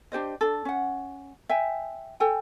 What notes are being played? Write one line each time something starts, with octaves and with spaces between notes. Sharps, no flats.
D4 G4 C5 D#5
D4 A4
C#4 F#5
E5 G5 G#5
A4 G5 G#5